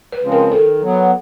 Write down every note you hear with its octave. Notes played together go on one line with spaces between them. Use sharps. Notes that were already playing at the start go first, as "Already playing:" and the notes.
B4
C#3 F3 G#3 C4
A#4
D#3 A4
F#3 B3